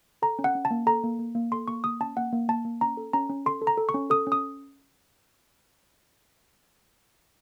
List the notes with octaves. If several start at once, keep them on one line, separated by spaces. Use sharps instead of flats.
A4 A#5
C#4
F#5
C#4
A5
A#3
A4 A#5
A#3
A#3
A#3
A4 C6
A#3 C#6
A#3 D#6
C#4 A5
A#3 F#5
A#3
A#3 A5
A#3
C#4 A#5
A4
C#4 A#5
C#4
A4 C6
A4
A#5
A4
C#6
C#4
A4 D#6
C#4
D#6